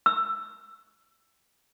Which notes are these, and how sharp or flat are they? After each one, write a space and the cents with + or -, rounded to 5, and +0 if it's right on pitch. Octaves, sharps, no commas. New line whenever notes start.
E6 +10